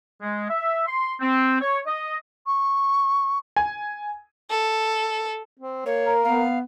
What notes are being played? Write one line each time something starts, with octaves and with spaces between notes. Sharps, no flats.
G#3
E5
C6
C4
C#5
D#5
C#6
G#5
A4
C4
A#3 C#5
A#4
B3 F5